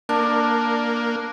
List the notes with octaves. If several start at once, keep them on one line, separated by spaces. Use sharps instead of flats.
A#3 D4